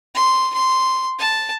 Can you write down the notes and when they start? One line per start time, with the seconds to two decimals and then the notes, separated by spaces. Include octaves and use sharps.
0.15 C6
0.54 C6
1.20 A5